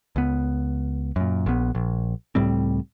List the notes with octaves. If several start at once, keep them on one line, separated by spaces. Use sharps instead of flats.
C#2 B3
F#2 A#2
A#1 B3
A#1
C#2 A2 G3 C4